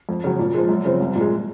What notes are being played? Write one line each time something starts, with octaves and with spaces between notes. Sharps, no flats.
F2
C#3 F#3
A#2
F3 G#3
F#2
C#3 F3 C4
C2
A#2 G#3